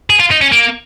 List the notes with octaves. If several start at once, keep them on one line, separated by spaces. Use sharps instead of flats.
G#4
F4
D#4
C#4
A#3